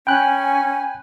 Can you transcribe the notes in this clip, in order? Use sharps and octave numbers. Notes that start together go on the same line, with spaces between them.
C#4 G5 G#5 B5 F#6